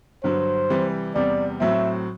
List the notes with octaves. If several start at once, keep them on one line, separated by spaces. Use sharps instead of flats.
G2 D3 F#3 C5
C3 E3 G3
E2 C3 G3 D5
A2 F#3 C4 E5